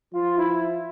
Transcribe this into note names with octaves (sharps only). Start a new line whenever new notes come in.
F3 F4
E4